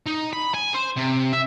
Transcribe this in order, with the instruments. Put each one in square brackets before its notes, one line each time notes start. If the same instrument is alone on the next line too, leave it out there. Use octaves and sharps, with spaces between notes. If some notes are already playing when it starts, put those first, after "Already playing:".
[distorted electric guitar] D#4
B5
G#5
C5
C3
E5